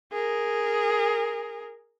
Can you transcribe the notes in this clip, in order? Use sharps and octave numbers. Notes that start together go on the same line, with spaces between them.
G#4 A#4